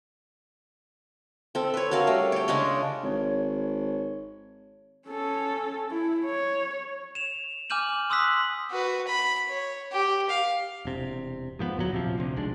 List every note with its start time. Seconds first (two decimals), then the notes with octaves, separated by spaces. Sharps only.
1.55 C4 A4
1.74 B4 C#5
1.91 C#4 F#4 A#4 F5
2.07 G3 A3
2.32 G4 C#5
2.48 C#3 G#3 C#4 D4
3.03 G#1 C#5
5.08 C#4 A4
5.91 E4
6.25 C#5
7.15 E7 F7
7.70 G#5 D6 F6 G6 D#7 F#7
8.10 C6 D#6 E6 F#6 B6 F#7
8.70 F#4 B4
9.07 B5
9.48 C#5
9.91 G4
10.29 F5
10.85 E1 C3
11.59 G#2 F3 G3 B3
11.76 D1 E2 F3 F#3
11.92 A#1 C3 F3
12.18 D2 C3
12.37 B1 G#3 D4